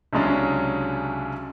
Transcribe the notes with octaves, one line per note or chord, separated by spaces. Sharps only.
C2 C#3 F#3 G#3 C#4 D4